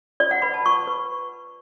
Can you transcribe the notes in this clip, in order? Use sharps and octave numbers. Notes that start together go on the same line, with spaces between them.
F4 D5
F#5
B4 B5
A5
F4 C#6
B4